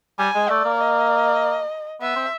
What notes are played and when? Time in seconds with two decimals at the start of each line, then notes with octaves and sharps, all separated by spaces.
0.19 G3 G#5
0.35 G#3
0.49 A3 D5
0.65 A#3
0.80 D#5
2.01 B3 E5
2.16 C4